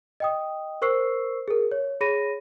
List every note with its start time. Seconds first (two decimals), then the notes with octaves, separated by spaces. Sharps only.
0.20 D#5 G5 D#6
0.82 A#4 C5 C#6 E6 C7
1.48 G#4 A#4
1.72 C#5
2.01 G#4 C#5 B5 A#6 D#7